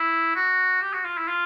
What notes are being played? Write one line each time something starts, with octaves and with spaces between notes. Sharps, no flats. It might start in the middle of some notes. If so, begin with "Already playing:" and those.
Already playing: E4
F#4
G4
F#4
F4
E4
F4